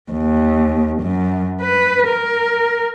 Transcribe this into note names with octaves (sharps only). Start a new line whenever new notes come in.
D#2
F#2
B4
A#4